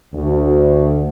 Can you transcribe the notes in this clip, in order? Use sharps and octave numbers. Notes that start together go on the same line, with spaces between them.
D2